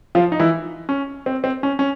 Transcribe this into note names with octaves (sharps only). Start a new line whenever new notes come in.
F3 F4
D#4
E3 E4
C#4
C4
C4
C#4
C#4